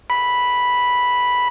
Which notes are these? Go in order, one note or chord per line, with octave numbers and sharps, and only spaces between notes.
B5